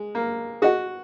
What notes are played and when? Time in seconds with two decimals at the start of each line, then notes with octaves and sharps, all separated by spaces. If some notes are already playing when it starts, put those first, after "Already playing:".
Already playing: G#3
0.15 A#3
0.62 F#4 G#4 D#5 F#5